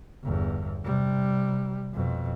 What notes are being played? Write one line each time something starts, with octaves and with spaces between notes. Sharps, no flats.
G1 E2
C3 G3
F2 B2